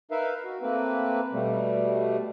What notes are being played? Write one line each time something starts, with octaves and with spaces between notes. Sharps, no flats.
D#4 A#4 B4 E5 F5
F#4
A3 A#3 C4 B4
B2 G3 A3